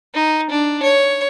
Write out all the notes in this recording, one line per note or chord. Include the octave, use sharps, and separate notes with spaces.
D#4
D4
C#5